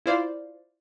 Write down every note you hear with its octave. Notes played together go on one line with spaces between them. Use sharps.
E4 F4 C5 D5 F5